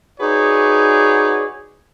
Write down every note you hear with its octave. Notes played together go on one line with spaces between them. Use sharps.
D#4 F#4 G#4 B4 C#5 D5